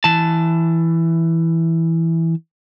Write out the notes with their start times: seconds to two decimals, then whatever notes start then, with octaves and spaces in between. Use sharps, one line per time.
0.04 E3 A5